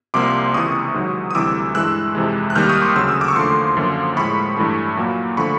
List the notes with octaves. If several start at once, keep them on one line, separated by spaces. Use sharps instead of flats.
C2 C3 F3 A#3 C6 D6
C#2 C3 E3 C#6 D#6
G#2 D#3 F#3
D#6
D2 C3 E3 G3 D6 E6
G2 E3 G#3 E6 F#6
F2 C3 E3 G#3
F#6
D#2 D#3 G3 A#3 F6 G6
C#6 D#6
C6 D6
D2 C#3 F#3 E6
D#6
D6 E6
C#6
D#2 D3 F3 A3 C6 D6
F#2 D3 F3 A#3
A2 F3 G#3 B5 C#6
G2 E3 A3
A#2 F#3 A#3
D3 F3 A3 B5 C#6